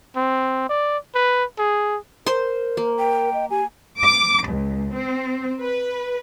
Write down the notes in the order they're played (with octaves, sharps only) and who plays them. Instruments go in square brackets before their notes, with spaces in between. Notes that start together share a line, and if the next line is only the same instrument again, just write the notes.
[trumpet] C4
D5
B4
G#4
[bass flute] A#4 [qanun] C5 C6
[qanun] A#3
[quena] G5
[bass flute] D#5
[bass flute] G4 [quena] G#5
[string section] D6
C#2
C4
B4